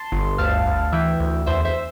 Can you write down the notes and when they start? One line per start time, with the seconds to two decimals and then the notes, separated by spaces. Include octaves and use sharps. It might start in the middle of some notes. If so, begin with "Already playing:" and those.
Already playing: A5 C6
0.12 G1
0.38 D2 F5 A5
0.66 D2
0.92 E3 E5 G5
1.20 D2
1.46 E2 C5 E5
1.65 C5 E5